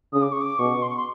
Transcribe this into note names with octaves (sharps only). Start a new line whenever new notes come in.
C#3 D#6
D6
C#6
D6
B2 C#6
C6
C#6
C6